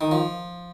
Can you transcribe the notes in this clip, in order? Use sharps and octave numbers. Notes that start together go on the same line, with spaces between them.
D#3
F3